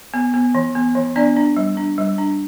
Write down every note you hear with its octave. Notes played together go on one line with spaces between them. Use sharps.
B3
B3
E3
B3
E3
B3 D4 D5
D4
G3
D4
G3
D4